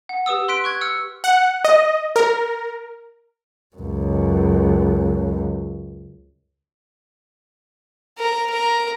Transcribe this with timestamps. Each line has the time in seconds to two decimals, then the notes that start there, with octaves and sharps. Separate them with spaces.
0.09 F#5
0.26 G4 B4 D#6 E6
0.48 C6 F#6 B6 D7
0.64 C#6 F#6 G#6
0.81 E6 F6 C#7
1.24 F#5
1.65 D#5
2.16 A#4
3.76 C#2 F#2
8.18 A#4
8.51 A#4